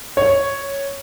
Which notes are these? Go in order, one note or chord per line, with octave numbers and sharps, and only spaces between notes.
C#5